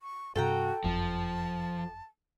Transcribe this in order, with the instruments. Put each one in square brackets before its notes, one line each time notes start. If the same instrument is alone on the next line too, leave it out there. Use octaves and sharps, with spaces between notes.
[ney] C#6
[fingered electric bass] G2 C3 [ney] F#4 [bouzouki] A4 G5 A#5
[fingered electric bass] F#1 F2 [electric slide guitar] F3 [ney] A5